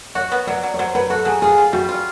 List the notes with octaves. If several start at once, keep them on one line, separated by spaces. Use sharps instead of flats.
F#4 C#5
B3
F#3 D5
F#3
C#5
F#3 C5
F#3 B4
F#4 A4
F#3 G#4
F4 G#4
F4
G3 F#4
F4